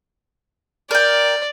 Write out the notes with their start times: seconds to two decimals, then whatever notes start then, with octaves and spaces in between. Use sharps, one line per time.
0.91 A#4 D5 G5